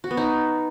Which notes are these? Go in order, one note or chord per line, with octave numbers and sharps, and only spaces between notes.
F#4
B3
D#4